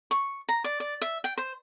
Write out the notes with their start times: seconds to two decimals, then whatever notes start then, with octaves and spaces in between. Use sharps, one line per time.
0.11 C#6
0.49 A#5
0.64 D5
0.80 D5
1.02 E5
1.24 G5
1.38 C5